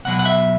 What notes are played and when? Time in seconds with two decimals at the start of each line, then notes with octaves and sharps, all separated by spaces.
0.05 B1 B2 F#3 F#5
0.19 F#5
0.25 E5